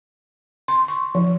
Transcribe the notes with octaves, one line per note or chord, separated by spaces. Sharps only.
C6
C#6
F3